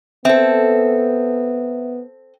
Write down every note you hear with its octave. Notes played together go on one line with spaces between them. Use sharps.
B3 C4 A4 C5 E5